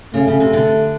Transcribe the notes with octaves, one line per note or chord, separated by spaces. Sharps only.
C#3 A3
C#3
C3
D3